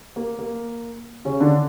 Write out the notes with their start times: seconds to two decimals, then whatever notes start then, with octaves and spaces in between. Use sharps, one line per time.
0.16 A#3
0.39 A#3
1.25 C#3 C#4
1.41 D3 D4